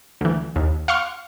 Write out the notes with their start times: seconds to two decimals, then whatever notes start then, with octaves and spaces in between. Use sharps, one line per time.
0.21 D2 E3
0.56 D#2
0.88 F5 F#5 C6 C#6 F6